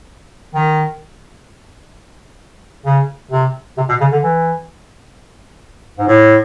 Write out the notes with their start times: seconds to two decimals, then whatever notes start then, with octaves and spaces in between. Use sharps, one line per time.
0.54 D#3
2.86 C#3
3.31 C3
3.77 C3
3.89 B2
4.00 C#3
4.12 D3
4.23 E3
5.98 G#2
6.07 A2